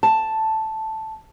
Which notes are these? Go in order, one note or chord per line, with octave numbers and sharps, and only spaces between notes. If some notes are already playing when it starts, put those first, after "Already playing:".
A5